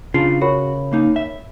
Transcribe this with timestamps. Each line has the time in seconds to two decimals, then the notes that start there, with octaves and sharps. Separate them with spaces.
0.14 C#3 D4 F4 C7
0.41 F#4 A#4 C#5 B5
0.93 A#3 D#4
1.16 E5